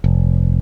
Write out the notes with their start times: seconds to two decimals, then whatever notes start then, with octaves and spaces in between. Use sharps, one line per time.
0.04 F1